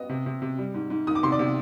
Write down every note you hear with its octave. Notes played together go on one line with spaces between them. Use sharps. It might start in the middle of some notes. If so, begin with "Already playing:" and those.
Already playing: B3 D#5 D#6
C3
C3
C3
G3
G#2
G#2
D#3 D#6
D6
C3 C6
D5 D6
C3